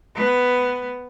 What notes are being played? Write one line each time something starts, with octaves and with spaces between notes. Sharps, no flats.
B3